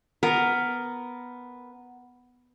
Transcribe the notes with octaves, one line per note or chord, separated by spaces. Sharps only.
B3 A#4